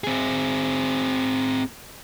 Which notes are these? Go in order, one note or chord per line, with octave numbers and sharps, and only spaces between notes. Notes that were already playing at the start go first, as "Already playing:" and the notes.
C4 G#4